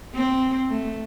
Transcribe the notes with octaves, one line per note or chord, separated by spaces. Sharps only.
C4
A3